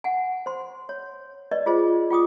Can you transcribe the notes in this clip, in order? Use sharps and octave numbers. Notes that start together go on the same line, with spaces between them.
F#5 G#5
C5 C6
C#5
B4 D5 D#5
F4 G#4 C5 D#5
F4 G5 D6 D#6